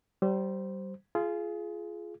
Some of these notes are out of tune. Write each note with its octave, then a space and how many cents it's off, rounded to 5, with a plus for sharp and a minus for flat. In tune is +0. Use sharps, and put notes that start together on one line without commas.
G3 -25 C5 +0
F4 -20 G#4 +20